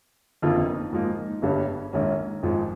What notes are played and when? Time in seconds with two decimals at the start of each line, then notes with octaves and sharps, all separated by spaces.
0.42 G1 F2 D#3 A#3 F4
0.92 G#2 F3 A#3 D#4
1.42 G1 G2 G3 C#4
1.93 A#1 G#2 D#3 A#3 C#4
2.43 G#1 G#2 F3